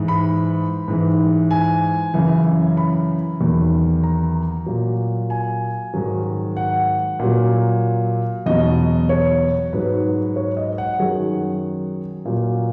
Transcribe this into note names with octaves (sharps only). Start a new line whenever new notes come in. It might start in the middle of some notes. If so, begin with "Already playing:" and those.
Already playing: G#2 E3
B5
G#2 E3
G#5
F#2 C#3 E3
B5
E2 D#3 F#3
A#5
A#2 F#3
G#5
G#2 D#3 F#3
F#5
A#2 F#3
E2 B2 F#3 D#5
C#5
G#2 F#3 B4
C#5
D#5
F#5
F#2 D#3 F#3 G#4
A#2 F#3